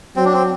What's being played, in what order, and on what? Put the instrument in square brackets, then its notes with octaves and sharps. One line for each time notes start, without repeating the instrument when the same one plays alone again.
[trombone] F#3 [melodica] C4
[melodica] D4
C4